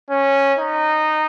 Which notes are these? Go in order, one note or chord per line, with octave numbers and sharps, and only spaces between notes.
C#4
D#4